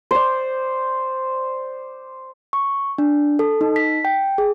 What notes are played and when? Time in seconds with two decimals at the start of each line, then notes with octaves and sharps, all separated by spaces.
0.11 C5 D5
2.53 C#6
2.98 D4
3.39 A4
3.61 D#4
3.76 B6
4.05 G5
4.38 G#4